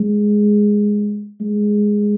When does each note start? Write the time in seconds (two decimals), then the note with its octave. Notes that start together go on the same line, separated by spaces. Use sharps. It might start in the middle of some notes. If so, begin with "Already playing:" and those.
Already playing: G#3
1.41 G#3